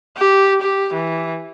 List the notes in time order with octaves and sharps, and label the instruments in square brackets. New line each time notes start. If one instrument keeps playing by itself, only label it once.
[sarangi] G4
G4
E3